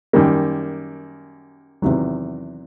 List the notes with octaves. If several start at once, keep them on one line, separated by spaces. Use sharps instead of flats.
F#2 D#3 G3 A#3
E2 C3 D#3 F#3